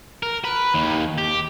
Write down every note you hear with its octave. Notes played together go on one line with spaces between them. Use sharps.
A#4
B4
D#2
G4